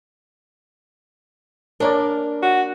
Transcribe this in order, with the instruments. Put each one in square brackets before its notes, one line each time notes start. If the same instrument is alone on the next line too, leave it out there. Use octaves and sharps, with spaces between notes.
[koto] A#3 D4 [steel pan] A#4 C#5 D5
[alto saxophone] F#4